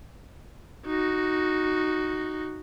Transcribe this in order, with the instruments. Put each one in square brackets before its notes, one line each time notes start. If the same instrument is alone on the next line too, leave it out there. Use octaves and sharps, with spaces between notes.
[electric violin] D#4 F#4